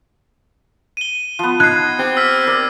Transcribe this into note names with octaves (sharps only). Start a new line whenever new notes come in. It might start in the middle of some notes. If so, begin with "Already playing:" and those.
D#7 G7
F3 B3
D#4 F#6 G#6 C7
C4 G4
E6 F6 B6
A#4 D5